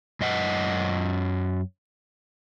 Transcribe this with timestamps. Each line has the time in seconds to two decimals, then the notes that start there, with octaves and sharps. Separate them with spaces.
0.21 F#2 D#5 F#5